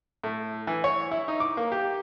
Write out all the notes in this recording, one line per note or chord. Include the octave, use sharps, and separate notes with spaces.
A2
E3
C#5
E4
D#4
D6
A#3
G4